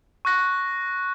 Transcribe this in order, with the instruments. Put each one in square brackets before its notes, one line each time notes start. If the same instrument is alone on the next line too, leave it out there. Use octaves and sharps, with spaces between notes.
[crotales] C#6 F#6 A#6